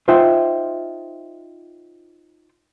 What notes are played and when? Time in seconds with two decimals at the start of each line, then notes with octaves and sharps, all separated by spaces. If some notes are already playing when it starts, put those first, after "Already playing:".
0.08 D#4 F4 C5 E5 F#5 G5